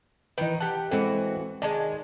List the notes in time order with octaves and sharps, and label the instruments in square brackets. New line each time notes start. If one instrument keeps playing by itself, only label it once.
[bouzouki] D#3 D#4 [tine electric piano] E3 B4
[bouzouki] G4 F#5 [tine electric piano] A5
[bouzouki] E3 F#4 [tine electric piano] G#3 C4 A4
[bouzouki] D#3 G#3 [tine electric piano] D5 A5